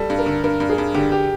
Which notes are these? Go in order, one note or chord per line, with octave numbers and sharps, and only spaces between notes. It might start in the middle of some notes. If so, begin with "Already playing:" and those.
Already playing: G3 A4
G2
A#4
D3
G2 A#4
G2
G#4
G2
D3 G4
G4